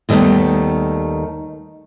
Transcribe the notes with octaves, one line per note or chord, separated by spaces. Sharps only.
D#2 D#3 G3 A3 B3